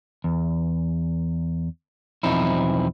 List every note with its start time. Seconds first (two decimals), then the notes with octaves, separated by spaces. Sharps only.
0.24 E2
2.23 B1 E2 F3 C4 D#4 E4